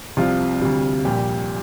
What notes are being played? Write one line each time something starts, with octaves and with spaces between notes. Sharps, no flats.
C2 C3 F3 F4
D2 C3 G3
A#1 A#2 G3 G4